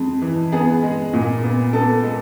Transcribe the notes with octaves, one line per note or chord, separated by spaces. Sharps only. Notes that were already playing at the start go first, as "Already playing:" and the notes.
Already playing: F2 G#3
E3
B3 G#4
G#3
A#2
B3
B3 A4
G#3